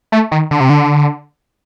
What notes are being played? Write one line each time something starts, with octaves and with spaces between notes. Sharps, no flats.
A3
D#3
D3
C3
D3